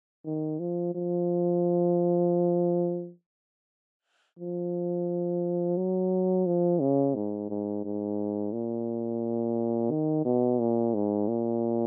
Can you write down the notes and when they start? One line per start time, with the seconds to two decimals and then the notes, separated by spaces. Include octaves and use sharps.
0.26 D#3
0.60 F3
0.95 F3
4.39 F3
5.77 F#3
6.46 F3
6.81 C#3
7.15 G#2
7.50 G#2
7.84 G#2
8.53 A#2
9.91 D#3
10.25 B2
10.59 A#2
10.94 G#2
11.28 A#2